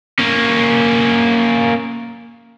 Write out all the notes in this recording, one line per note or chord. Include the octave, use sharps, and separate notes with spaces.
A#3 C#4